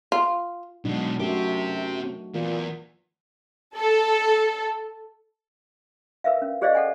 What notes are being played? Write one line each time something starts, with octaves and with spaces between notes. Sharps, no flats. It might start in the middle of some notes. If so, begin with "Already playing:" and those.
F4
B2 F#3 G#3 D4 D#4
F#2 A3 C4 F#4 G4
E2 A#2
A4
A#4 B4 E5 F5
C#4
G4 G#4 C5 D5 D#5 F5
A4 F#5 G#5